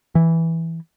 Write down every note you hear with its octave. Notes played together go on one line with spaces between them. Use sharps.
E3